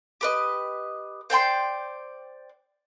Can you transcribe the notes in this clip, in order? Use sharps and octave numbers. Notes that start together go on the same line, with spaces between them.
G4 B4 D#5
C5 D5 G5 C6